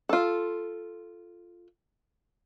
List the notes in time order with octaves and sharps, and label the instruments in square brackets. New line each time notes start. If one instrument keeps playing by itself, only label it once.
[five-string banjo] F4 A4